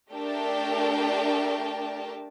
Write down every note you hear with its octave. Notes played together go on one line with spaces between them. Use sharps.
A3 D4 G4 A#4 G5 A5